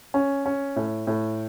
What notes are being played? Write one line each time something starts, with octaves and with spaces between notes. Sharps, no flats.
C#4
C#4
A2
A2